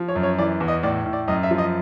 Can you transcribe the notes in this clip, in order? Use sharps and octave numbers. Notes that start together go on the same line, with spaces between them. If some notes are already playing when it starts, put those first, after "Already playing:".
Already playing: F3
C#5
F#2
C#5
E3 D5
E2
D#5
A2 D5
A2
D5
F#2 D#5
E5
F3
D#5